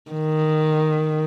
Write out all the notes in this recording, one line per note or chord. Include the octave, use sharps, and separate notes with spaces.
D#3